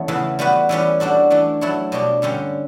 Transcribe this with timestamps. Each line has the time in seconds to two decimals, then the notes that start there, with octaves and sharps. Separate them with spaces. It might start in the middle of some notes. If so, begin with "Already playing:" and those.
Already playing: E2 A3 C#4
0.08 C#3 E3 B3
0.39 G3 B3 F#4 B4
0.69 E3 G3 C#4 G4 B4
1.00 G3 D4 F#4 A4
1.30 E3 A3 D4
1.61 F#3 A3 E4 A4 C#5
1.92 B2 G3 D4 G4 C#5
2.22 G2 D3 G3 C#4 G4